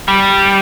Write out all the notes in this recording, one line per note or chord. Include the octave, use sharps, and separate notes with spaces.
G3